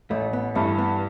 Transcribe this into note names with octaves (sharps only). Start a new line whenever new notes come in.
A1 A3
B3
G2 E3 A3
B3